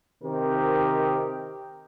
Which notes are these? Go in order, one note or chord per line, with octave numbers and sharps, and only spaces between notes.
C3 D#3 C4 D#4 G4 A#4